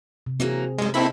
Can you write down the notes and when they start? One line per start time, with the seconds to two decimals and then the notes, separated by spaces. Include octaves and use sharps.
0.26 C3
0.40 E3 F#3 A#3 C4 G#4
0.78 F#2 G3 G#3
0.94 A#3 C4 D#4 E4 A4 B5